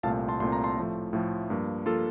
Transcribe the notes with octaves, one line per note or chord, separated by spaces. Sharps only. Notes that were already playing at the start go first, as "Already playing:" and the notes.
C2 A#2 A3 C4 F5 A5
A5 C6
C2 A#2 A3 C4 C6
A#5
A5 C6
A2 F3 A3
A2 F3 A3
G2 F3 A#3
F3 A#3 F4 A4